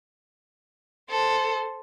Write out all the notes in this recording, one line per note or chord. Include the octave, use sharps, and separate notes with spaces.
A4 C5